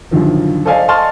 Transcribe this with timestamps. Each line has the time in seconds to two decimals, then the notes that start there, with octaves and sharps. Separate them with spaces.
0.11 F#2 A#2 D3 D#3 F3
0.65 A4 C5 D5 D#5 F5 G#5
0.88 D#5 A5 C6 C#6 F6 A6